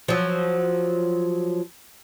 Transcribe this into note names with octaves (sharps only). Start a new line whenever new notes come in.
F3 F#3